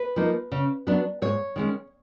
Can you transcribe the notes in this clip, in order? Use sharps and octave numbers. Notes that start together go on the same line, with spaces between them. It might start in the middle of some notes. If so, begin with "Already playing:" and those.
Already playing: B4
F3 A#3 D#4
C#3
F#3 B3 D4
G#2 C#5
D#3 G#3 C#4